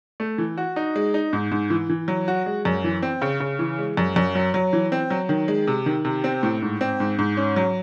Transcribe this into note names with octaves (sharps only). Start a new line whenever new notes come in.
A3
E3
F#4
D#4
G#3
D#4
G#2
G#2
E3
E3
F#3
F#4
G#3
F#2
E3
C4
C#3
C#3
E3
G#3
F#2
F#2
F#3
F#3
E3
C4
F#3
D#3
G#3
C3
D#3
C3
C4
A2
G#2
C4
G#2
G#2
C#4
F#3